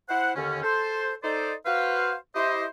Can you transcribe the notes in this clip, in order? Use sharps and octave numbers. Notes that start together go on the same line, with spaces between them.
E4 C5 F#5
D#2 D3 C#4
A4 C5
D#4 A4 C5 D5
F#4 B4 C5 F5
E4 G4 C5 D#5